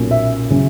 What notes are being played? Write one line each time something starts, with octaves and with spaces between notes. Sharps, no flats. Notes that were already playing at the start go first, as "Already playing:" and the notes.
Already playing: B1 A#2 A#3 C#4
E5
C#3 F#3 C#4